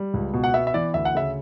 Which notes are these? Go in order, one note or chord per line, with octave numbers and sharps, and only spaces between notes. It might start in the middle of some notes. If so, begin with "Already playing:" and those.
Already playing: G3
C#2
B2
F#5
B3 E5
E5
E3 D5
D2 E5
F#5
C#3 E5